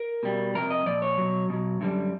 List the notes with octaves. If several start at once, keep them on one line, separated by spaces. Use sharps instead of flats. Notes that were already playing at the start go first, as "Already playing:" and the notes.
Already playing: A#4
B2 G3
F2 C3 A#4
D#5
A#2 F3 D5
C#5
B2 F#3
B2 F#3
F#2 D3 G3